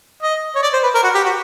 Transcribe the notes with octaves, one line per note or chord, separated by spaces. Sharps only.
D#5
C#5
D5
C5
B4
A#4
F#4
G4
F#4